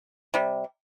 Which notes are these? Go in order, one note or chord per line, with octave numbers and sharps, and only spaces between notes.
C3 G3